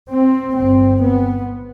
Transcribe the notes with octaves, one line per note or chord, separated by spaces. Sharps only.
C4
G1 G2 C4
B3